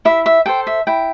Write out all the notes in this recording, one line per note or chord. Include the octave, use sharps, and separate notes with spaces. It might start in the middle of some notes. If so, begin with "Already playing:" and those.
E4 E5
E5
A4 C5 G5
E5
E4 G5